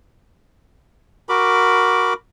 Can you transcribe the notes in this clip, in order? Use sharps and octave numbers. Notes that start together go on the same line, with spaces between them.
F#4 A#4 B5 D6